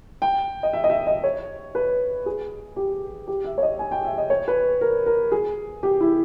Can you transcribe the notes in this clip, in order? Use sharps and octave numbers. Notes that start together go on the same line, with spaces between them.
G5
D#5
E5
D#5
E5
D#5
C#5
B4
G#4
G4
G4
E5
C#5
D#5
G#5
G5
E5
D#5
C#5
B4
A#4
A#4
G#4
G4
E4